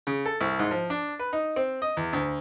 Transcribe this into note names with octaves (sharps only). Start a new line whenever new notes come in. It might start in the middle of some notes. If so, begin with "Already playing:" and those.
C#3
A4
C2
G#2
F3
D4
B4
D#4
C4
D#5
E2
D2